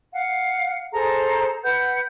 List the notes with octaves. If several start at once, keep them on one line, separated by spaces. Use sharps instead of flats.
F5 F#5
G#4 A4 C5 A#5
B4 F#5 G6